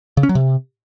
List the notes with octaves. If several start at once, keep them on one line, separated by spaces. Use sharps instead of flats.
C#3
C#4
F#3
C3